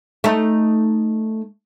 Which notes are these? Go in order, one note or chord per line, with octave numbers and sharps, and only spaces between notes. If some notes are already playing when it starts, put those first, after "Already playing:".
A3 D#4